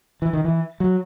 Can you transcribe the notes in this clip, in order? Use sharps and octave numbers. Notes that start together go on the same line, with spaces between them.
E3
D#3
E3
F#3